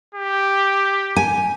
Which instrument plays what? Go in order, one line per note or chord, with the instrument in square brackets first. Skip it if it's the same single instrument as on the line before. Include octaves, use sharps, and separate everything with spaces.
[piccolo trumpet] G4
[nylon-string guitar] G#5